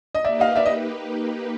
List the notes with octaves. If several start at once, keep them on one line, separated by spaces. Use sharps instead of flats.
D#5
A#3 D#4 G4 B4 D5 E5
D#5 F5
D5 E5
D#5